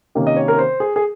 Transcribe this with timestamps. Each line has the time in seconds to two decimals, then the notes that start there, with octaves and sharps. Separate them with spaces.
0.15 C3 D#3 A#3 C#4
0.27 D#5
0.36 C#5
0.48 A#4
0.58 C5
0.80 G#4
0.96 G#4